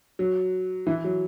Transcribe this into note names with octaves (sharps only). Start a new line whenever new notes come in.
F#3
E3
F#3